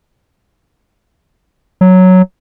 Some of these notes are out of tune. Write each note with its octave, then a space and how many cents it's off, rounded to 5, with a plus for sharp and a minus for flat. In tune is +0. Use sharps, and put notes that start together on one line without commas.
F#3 +0